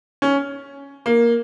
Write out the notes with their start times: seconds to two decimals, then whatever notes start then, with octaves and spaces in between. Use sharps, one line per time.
0.22 C#4
1.06 A#3